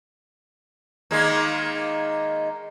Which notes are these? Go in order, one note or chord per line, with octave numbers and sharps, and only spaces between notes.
D#3 G#3 A#3